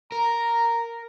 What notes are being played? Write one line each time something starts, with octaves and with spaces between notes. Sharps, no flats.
A#4 A#5